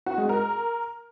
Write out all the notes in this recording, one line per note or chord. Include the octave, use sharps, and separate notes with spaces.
F#4
G#3
A#4